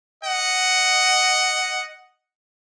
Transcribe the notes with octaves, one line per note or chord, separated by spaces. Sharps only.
D#5 F#5